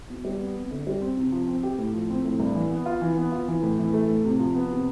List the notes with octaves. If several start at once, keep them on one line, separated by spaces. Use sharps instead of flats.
B2
G3
B3
F2
D3
G3
C4
C3
F3
C4
G4
A2
F3
C4
A2
G2
E3
B3
F4
E3
B3
F4
E3
A2
E3
A3
A2
C3
F3
B3
C3